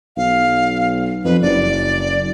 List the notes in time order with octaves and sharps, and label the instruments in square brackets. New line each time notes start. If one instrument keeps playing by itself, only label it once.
[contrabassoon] B1 [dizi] F5
[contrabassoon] F2 [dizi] B4
[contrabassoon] F#1 [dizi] D5